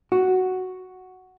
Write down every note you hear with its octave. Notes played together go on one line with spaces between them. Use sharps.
F#4